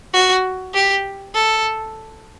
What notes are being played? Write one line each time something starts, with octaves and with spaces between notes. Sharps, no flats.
F#4
G4
A4